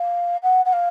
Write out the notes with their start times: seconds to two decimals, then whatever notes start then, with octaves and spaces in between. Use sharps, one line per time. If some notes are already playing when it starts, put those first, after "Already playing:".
Already playing: F5
0.43 F#5
0.65 F#5
0.73 F5